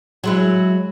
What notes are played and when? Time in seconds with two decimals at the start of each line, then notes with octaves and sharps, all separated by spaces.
0.24 F#3 G#3 E4